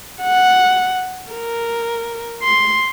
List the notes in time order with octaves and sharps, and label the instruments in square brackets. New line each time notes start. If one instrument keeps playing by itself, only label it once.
[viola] F#5
A#4
C6